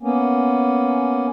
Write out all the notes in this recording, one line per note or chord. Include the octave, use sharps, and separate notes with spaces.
A#3 B3 C#4